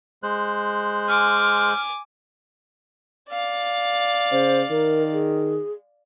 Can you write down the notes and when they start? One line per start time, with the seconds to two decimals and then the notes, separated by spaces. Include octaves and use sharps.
0.23 G#3 C5 F#6
1.08 G#5 D6 F6
3.30 D5 F5
4.32 C#3 C5
4.70 D#3 A#4
5.13 G#4